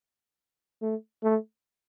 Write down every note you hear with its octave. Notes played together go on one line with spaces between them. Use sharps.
A3
A3